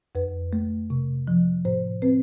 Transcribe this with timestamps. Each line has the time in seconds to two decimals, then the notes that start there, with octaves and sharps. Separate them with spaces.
0.15 F2 B4
0.53 A3
0.90 C3
1.28 F3
1.65 A2 C5
2.02 C4 B4